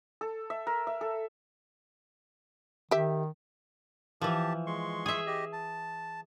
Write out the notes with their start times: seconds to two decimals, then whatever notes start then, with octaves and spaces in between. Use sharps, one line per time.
0.21 A4
0.50 E5
0.67 A#4
0.87 E5
1.01 A4
2.91 D#3 G4 E5
4.21 E3 F3 G4 A5
4.67 G#3 C6 C#6
5.06 G#4 E5
5.27 G4 D#5
5.53 A5